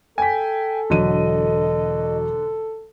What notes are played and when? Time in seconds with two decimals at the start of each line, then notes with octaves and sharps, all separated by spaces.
0.18 A4 G5 G#5 B6
0.90 E1 D3 F#3 D#5 D#7